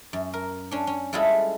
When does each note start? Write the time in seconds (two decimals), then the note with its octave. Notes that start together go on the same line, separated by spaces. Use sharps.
0.13 F#2
0.34 A#4
0.71 C#4 D4
0.87 C#4
1.13 G3 G#3 E4 F4 G#4 A4